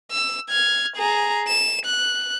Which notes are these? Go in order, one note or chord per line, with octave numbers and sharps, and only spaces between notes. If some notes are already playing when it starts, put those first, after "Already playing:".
E6
F6 G#6
G#4 A#5
E7
F#6